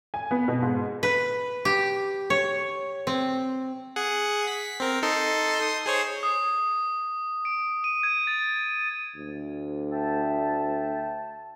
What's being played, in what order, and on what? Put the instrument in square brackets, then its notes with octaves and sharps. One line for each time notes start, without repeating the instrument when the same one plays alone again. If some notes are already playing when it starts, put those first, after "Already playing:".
[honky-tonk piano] G#5
B3
B2
G#2
[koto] B4
G4
C#5
C4
[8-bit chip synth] G#4 F#5
B6
C4 A#4
D#4 A4 C6
C6 D#6
G#4 C5 C#5
[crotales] D#6
D7
D#7
G#6
A6
[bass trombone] D2
[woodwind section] E5 G5 A5